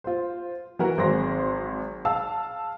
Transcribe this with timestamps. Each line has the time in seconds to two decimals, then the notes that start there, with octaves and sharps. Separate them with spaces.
0.04 F4 C5
0.79 E3 E4 F#4 A#4
0.98 G#1 F#3 C4 G#4 C6 A#6
2.05 F5 A5 E6